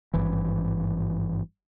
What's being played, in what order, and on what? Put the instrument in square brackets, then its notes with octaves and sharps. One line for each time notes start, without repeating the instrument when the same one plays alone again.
[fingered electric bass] G#1 G2 E3